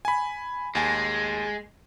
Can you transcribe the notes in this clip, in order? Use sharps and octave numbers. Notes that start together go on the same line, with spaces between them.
G#5 B5
D#2 G#3 G#5